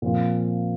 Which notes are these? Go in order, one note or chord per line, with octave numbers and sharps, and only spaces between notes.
A#2 F3 C4 F4